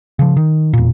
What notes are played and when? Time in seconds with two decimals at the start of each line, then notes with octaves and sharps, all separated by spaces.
0.19 C#3 F3
0.37 D#3
0.73 E1 A#2